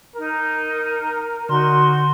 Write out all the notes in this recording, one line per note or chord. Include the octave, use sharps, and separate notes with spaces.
D#4 A#4
D3 D#4 F#4 C6